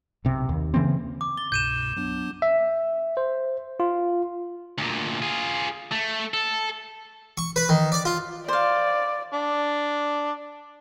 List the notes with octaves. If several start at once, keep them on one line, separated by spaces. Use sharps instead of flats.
B1 C3
D#2
C#3 E3 A#3 C4
D6
A6 G7
C2 G2 B2 G6 D#7 E7
F#3 B3 D4
E5
C5
F4
D2 A#2
F4 G#4
A3
A4
C#6
B4
D#3
D5
F4
C5 D5 F5
D4